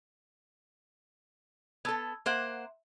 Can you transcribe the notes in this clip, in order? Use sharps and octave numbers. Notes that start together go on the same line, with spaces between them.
B3 A4 A5 E6 G#6
A#3 C5 E5 F#5